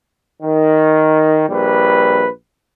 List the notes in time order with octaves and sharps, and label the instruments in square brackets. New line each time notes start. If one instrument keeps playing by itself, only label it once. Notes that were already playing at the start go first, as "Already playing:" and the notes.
[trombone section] D#3
A#1 G3 B4